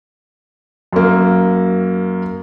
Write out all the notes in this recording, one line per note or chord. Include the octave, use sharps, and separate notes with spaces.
F#2 A#3